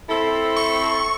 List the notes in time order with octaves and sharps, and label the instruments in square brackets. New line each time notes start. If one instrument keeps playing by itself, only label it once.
[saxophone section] C4 A4 [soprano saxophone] E4
[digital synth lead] C#6